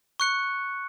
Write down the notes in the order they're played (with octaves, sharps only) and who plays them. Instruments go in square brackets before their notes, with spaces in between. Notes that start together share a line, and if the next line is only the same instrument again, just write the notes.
[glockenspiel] C#6 F#6 C#7